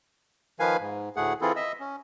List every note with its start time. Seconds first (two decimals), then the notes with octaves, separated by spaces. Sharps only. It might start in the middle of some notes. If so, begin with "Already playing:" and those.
0.60 D#3 F3 B4 F5 G#5
0.80 G#2
1.16 D2 A2 A3 G#4 F#5
1.41 E3 C4 E4 F4 G#4 A4
1.56 D#5 E5 E6
1.80 C#4